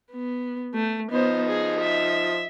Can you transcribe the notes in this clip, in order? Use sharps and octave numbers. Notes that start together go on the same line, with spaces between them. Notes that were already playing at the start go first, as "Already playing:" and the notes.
B3
A3
F3 B3 D#4 C5 D#5
G#4
E5